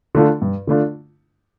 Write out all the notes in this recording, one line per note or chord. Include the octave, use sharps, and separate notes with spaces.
D3 A3 D4 F4
G2
D3 A3 D4 F4